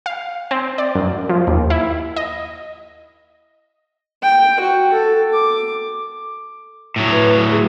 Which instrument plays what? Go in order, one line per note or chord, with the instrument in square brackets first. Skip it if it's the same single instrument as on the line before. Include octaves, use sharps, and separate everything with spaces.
[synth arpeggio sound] F5
C4
D5
F#2
F3
D#2
E4
D#5
[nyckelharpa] G5
F#4
A4
D6
[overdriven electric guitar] A2 F#3
[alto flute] B4
G#4